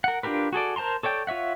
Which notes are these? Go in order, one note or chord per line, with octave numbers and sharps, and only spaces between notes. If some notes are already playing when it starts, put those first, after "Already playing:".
A#4 F#5
D4 F4 G4 A#4 B4
F#4 G#4 A4 D5
A#4 C5 A5 A#5 C6
A4 C#5 D5 G5
F4 C#5 E5 F#5